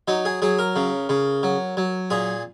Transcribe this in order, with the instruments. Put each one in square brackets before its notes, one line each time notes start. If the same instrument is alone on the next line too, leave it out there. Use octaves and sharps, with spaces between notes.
[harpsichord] F#3 D#4
G#4
F#3 G#4
A#4
C#3
C#3
F#3
F#3
A#2 G#4